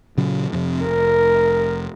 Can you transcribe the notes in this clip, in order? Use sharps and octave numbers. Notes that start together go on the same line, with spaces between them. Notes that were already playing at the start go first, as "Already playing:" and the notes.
A#2 C#3 F#3
F2 C3
F1 A#4